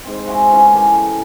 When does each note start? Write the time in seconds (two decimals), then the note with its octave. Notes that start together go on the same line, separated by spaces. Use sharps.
0.05 G#2 C4
0.27 E4 F#4 G#4 C5
0.51 E3 C#4 B5
0.71 G4 A4 A#4 G#5